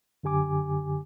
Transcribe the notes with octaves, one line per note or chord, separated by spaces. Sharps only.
F#2 D3 G4 G#5 D6